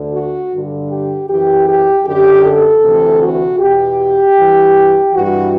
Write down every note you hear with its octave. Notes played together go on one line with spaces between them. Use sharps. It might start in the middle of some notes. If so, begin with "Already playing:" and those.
Already playing: D2 D3
F#4
G2 D3
G4
F#2 E3 G4
G4
F#2 D3 G4
A4
D2 C3 E3
F#4
E2 B2 G4
G2 E3
G2 E3 F#4